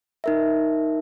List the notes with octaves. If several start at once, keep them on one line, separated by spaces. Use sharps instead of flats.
D#4 A#4 E5